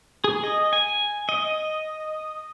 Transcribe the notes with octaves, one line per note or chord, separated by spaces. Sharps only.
G#4
D#5
G#5
D#5